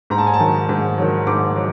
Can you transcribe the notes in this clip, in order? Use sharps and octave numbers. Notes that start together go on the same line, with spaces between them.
G#2 A#5
A5
G#5
A5
D#3 F#3
G#2
D#3 F#3
G#2 D6
F#3